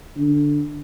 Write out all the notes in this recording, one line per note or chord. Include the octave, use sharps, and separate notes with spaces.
D3